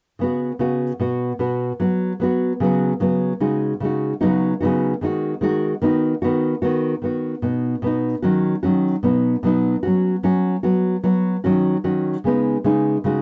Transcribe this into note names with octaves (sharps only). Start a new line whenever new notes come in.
C#3 B3 F#4
C#3 B3 F#4
B2 B3 F#4
B2 B3 F#4
F#3 B3 F#4
F#3 B3 F#4
C#3 F#3 B3 F#4
C#3 F#3 B3 F#4
C#3 G#3 D#4 F#4
C#3 G#3 D#4 F#4
C#3 F#3 B3 D#4 F#4
C#3 F#3 B3 D#4 F#4
D#3 G#3 D#4 F#4
D#3 G#3 D#4 F#4
D#3 B3 D#4 F#4
D#3 B3 D#4 F#4
D#3 B3 F#4
D#3 B3 F#4
B2 B3 D#4
B2 B3 D#4
D#3 F#3 C#4 F#4
D#3 F#3 C#4 F#4
B2 F#3 B3 D#4
B2 F#3 B3 D#4
F#3 C#4 F#4
F#3 C#4 F#4
F#3 B3 F#4
F#3 B3 F#4
D#3 F#3 C#4 F#4
D#3 F#3 C#4 F#4
C#3 G#3 B3 D#4
C#3 G#3 B3 D#4
C#3 G#3 D#4 F#4